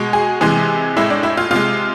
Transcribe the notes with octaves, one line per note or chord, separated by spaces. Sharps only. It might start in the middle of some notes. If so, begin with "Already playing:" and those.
Already playing: B2 G#3
G#4
C3 E3 G#3 G#4
A2 G#3 E4
D4
E4
F4
C3 G#3 F4